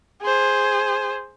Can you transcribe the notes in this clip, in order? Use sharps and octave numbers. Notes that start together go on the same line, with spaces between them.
G#4 C5